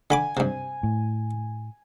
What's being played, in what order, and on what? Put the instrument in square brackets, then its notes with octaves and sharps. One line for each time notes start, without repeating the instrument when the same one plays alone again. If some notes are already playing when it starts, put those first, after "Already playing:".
[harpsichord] D3 B5 D6 [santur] G#5
[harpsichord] G2 C3
[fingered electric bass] A2